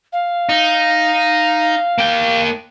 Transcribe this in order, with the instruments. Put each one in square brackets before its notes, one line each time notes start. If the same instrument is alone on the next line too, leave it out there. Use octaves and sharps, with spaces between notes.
[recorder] F5
[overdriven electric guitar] D#4
A#3 G5